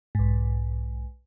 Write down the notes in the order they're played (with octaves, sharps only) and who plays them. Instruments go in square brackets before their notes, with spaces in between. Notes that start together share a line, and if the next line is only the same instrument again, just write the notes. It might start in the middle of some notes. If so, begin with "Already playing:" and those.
[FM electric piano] B1 G#2